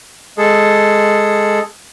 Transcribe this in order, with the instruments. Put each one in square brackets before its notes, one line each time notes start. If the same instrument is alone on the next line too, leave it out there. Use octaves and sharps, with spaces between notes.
[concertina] G#3 G#4 A4